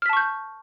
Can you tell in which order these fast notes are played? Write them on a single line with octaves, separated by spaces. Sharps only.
F6 B6 A5 C#6 G6